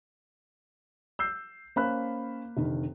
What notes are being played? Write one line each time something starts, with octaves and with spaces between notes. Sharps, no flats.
E6 G6 C7
A#3 C#4 C5 F5 B5 F#6
F1 D3 D#3